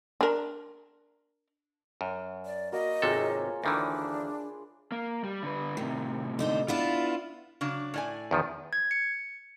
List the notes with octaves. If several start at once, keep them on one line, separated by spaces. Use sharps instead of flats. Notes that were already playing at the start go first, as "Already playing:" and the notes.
D4 A#4
F#2
D5
A#3 F#4 D#5
G#1 C3 F4 G#4 A4 C#5
D2 D#3 E3 D4 B5 C6 D6
A#3
G3
D3 B4
A2 C3 D#3
D3 D#4 C5
B3 D4 E4 F4
C#3 F#3 D4
A2 D5 G#5
E2 D#3 F3
G#6
C#7